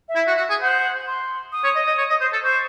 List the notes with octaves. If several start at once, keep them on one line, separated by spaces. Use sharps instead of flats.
E5
E4
F#4
F#4
G#4
C5 F#5
C6
D#6
C#5
D#5
D#5
C#5
D#5
C5
A4
C5 C#6